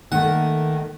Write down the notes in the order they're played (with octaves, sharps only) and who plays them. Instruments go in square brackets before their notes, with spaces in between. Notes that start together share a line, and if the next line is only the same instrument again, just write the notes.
[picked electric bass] D#3 [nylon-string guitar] A3 A#3 [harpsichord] F#5